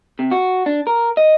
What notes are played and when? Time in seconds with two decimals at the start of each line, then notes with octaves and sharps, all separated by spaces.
0.19 C3
0.31 F#4
0.66 D4
0.87 A#4
1.17 D#5